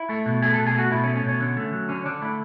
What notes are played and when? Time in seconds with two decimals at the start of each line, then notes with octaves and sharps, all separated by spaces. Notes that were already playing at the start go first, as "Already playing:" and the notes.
Already playing: E4
0.09 A3
0.26 B2
0.42 A3 G#4
0.54 B2 A4
0.67 G#4
0.75 A3 F#4
0.91 B2 E4
1.04 C#4
1.07 A3
1.15 C#4
1.23 B2
1.28 C#4
1.40 D3
1.57 A3
1.73 F#3
1.89 D3 C#4
2.06 D3 D4
2.21 A3 E4